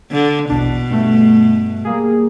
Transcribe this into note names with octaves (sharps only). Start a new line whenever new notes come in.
D3
A#1 E2 B2 D4
G2 A3
G3 A#3 G#4